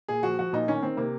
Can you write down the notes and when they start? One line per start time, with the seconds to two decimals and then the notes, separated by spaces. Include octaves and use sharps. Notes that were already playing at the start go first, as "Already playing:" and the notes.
0.08 A#2 G#4
0.23 F3 F#4
0.39 F3 F#4
0.53 A#2 D#4
0.68 D#3 C#4
0.82 D#3 C4
0.97 C3 A#3